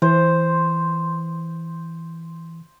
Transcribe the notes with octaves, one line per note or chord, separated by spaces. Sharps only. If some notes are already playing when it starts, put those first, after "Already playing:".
E3 C5